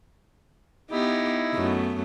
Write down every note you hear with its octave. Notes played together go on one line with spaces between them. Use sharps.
B3 D#4 E4 G4
F#2 A3 B3